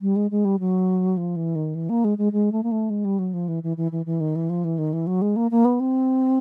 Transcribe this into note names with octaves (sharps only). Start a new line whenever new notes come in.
G3
G#3
G#3
G3
F#3
F3
E3
D#3
E3
A#3
G#3
G#3
G#3
A3
A#3
A3
G#3
G3
F#3
F3
E3
E3
E3
E3
E3
D#3
E3
F3
E3
D#3
E3
F#3
G#3
A#3
A#3
B3
C4